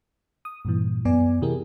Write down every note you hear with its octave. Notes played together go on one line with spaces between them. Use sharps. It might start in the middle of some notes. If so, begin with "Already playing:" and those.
D#6
G2 A#2 E3
F#2 B3 D5 G#5
C3 E3 E4 G4 G#4 A#4